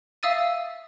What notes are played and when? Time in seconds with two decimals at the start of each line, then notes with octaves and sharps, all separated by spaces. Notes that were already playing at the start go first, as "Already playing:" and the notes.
0.23 E5 F5 D#6 E6 A6 D#7